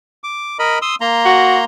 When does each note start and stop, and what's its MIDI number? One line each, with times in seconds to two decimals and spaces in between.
0.24 0.57 86
0.59 0.79 70
0.59 0.79 75
0.59 0.79 83
0.82 0.95 84
0.82 0.95 87
0.82 0.95 88
1.01 1.65 58
1.01 1.65 82
1.01 1.65 84
1.26 1.59 66